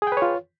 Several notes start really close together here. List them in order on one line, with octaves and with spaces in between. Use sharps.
G#4 G5 B4 C#5 F4